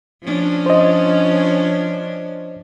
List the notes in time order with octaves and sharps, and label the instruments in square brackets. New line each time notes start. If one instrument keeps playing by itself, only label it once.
[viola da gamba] F3 C#4 D4
[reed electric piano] C5 D#5